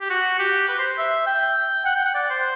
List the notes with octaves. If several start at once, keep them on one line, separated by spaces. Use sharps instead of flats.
G4
F#4
G4
B4
C5
E5
G5
F#5
G5
F#5
D5
C5